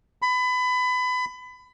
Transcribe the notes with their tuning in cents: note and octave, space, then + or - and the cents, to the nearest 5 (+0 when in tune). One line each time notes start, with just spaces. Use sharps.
B5 +25